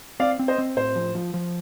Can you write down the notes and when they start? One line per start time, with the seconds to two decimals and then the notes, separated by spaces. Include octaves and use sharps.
0.20 C4 D5 F5
0.39 C4
0.48 C5 D#5
0.58 C4
0.77 A2 C5
0.96 F3
1.15 F3
1.34 F3